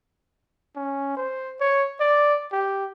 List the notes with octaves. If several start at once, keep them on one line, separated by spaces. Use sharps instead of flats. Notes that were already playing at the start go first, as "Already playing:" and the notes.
C#4
C5
C#5
D5
G4